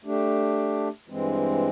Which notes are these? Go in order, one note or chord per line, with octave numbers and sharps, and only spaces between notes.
A3 D4 G4
G2 E3 G#3 C4